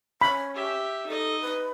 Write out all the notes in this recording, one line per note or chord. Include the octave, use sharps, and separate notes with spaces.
C#4 B5
G4 E5
D#4 A4 D#5
B4